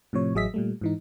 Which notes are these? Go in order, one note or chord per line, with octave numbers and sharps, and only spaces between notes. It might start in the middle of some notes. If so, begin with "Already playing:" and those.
A2 C3 F3 C#5
A1 F#3 G#4 D#5 E5 B6
A#2 G3 A3
G#2 E3 D#4